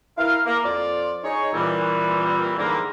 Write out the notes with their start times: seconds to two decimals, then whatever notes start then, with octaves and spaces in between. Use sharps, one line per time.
0.18 E4 A#4 F5
0.46 A#3
0.64 F2 F4 D5
1.24 D#4 G#4 C#5
1.53 A#2 E3 G3 C4
2.58 G#2 D3 E3 F3 G3 A#3